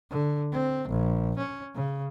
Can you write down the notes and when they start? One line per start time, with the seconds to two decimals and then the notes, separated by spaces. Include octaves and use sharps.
0.11 D3
0.52 C4
0.89 A#1
1.38 C#4
1.75 C#3